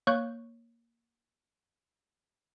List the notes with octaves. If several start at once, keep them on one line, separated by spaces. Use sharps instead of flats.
A#3 C#5 C#6 F#6 G6